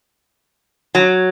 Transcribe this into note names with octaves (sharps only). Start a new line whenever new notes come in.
F#3